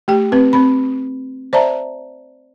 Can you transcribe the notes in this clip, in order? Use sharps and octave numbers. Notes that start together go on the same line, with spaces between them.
A3 G4 G5
C4 B4
C4 B5
C5 D5 E5 A5 A#5